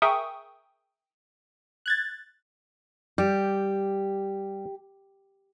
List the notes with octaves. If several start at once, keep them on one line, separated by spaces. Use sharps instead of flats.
G#4 A#4 E5 G5 C#6 D#6
F#6 G#6 A6
G3 G4